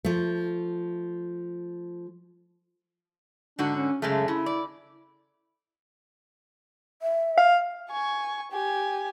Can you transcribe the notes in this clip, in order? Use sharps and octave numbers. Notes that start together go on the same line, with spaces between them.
F3 A3
G#2 D3 D4 F#4
C#4
F#2 C#3 G#3 A3
C#3 E4
D5
E5
F5
G#5 C#6
G4 G#5